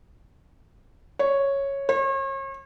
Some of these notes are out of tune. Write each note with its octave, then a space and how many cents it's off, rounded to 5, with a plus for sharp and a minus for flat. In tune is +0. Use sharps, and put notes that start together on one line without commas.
C#5 -5
C#5 -40